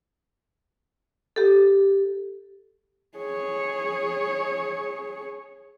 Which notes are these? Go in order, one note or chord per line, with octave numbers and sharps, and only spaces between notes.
G4 A4
G#4 C#5